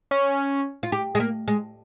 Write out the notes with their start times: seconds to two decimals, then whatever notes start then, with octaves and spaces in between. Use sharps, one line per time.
0.11 C#4
0.83 F4
0.92 G4
1.15 G#3
1.20 A#3
1.48 G#3